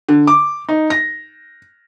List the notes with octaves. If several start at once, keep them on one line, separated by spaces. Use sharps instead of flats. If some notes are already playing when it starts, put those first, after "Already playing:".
D3
D6
D#4
A#6